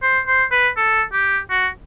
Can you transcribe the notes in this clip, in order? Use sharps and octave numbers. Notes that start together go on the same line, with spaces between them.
C5
C5
B4
A4
G4
F#4